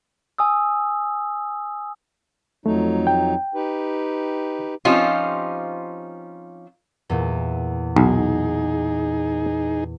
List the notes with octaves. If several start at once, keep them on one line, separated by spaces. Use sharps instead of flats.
G#5 D#6 E6
F2 F#3 A3 D#4
G5
D#4 G4 B4
F3 C4 C#4 D#4 F4 G4
E2 A#2
B1 D#4 G#4